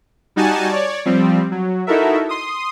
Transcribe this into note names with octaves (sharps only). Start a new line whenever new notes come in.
G3 D#4 F#4 G#5 A5
C#5 D5
F3 G3 C4
F#3
D#4 E4 F#4 A4 A#4 E5
C6 D#6